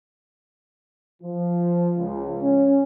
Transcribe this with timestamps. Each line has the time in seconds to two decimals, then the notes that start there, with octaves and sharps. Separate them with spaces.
1.23 F3
1.99 C#2
2.43 C#4